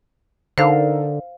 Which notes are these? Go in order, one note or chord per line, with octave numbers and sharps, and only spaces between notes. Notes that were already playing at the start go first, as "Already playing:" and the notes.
D3 D#4 A4 A#4 C5 F5